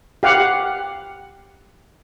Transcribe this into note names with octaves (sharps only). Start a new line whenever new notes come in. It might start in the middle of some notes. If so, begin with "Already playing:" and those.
G4 F5 F#5